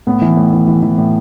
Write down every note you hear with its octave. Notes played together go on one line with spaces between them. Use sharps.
A2 B3
E3
A2
E3
E3
E3
A2